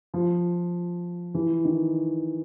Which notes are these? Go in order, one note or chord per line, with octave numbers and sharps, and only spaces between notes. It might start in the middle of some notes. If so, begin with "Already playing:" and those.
F3
E3
D#3